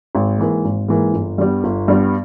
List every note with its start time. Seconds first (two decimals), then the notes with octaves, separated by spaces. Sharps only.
0.15 G#1
0.39 G#2 E3 A#3
0.65 G#1
0.89 G#2 E3 A#3
1.14 G1
1.38 G2 G3 B3
1.64 G1
1.88 G2 G3 B3